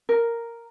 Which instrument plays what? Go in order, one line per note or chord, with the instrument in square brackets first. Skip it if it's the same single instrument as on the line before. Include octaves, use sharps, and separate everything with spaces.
[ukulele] A#4